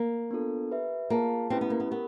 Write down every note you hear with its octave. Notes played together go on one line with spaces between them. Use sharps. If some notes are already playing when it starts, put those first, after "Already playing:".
Already playing: A#3
B3 D4 F4 A4
G4 B4 E5
A#3 F4 G#4 C#5 F5 A5
A3 C4 C#4 E4 G4 B4
B3
A#3
B3
B3 G4 A#4